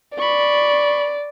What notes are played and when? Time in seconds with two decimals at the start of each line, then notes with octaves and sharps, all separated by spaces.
0.18 D5 B5 C#6